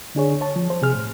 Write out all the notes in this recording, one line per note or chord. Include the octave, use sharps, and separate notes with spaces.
D3 D4 G#4 C#5
C#5 A5
F3
C5
C3 G#4 F6
A2